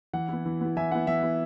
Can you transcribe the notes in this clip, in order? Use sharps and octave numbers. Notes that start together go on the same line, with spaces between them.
E3 F#5
B3 E4
E3
B3 E4
E3 E5 G#5
B3 E4 F#5
E3 E5
B3 E4